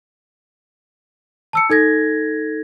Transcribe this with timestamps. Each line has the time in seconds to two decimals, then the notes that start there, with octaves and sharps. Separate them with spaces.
1.53 A5 E6 C#7
1.70 D#4 A4 G#6 A#6